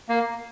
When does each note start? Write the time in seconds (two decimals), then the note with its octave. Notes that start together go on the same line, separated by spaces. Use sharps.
0.09 A#3